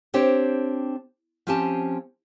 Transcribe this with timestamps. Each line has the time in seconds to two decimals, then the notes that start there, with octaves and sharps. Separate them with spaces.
0.14 C4 D4 G4 C5 C#5
1.47 F3 C4 C#4 G4 G#5 A5